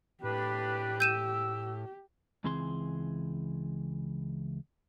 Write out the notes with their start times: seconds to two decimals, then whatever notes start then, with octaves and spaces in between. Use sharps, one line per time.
0.24 A2 D4 G4 B4
1.00 E6 G6 D#7 E7
2.44 C#2 E3 C4 G#4 C6